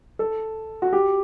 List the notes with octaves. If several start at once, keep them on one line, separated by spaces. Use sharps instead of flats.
A4
F#4
G4